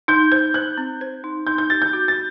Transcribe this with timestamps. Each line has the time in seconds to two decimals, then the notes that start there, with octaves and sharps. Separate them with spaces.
0.08 D#4 G6
0.32 C5 G6
0.54 C5 F#6
0.78 C4
1.01 C5
1.24 D#4
1.47 D#4 G6
1.58 G6
1.70 G4 A6
1.82 G6
1.93 F#4
2.08 A6